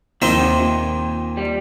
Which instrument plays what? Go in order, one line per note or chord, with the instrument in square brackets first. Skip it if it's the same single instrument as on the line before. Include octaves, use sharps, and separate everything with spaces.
[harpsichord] D#2 D#3 C4 D#4 [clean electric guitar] F3
[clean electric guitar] C3
A#2
G3